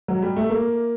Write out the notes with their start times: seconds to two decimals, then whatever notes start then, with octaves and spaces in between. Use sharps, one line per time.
0.08 F#3
0.22 G3
0.36 A3
0.49 A#3